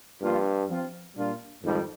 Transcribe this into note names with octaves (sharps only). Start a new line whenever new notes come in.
G2 F3 A#3 D4 F4
F3 C4 F4
A#2 G3 A#3 D4 F4
F2 G#2 D#3 G3